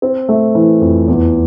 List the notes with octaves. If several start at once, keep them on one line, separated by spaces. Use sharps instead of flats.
C4
A3
E3
F2
E2